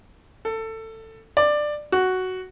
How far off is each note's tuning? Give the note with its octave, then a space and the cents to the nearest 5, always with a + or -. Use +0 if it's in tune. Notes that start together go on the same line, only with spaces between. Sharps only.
A4 +20
D5 +15
F#4 +5